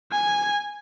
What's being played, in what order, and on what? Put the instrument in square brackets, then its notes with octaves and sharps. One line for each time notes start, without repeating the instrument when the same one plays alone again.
[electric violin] G#5